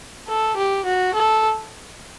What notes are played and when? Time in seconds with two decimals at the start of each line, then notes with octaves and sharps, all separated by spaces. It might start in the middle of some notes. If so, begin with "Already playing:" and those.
0.29 A4
0.57 G4
0.85 F#4
1.14 A4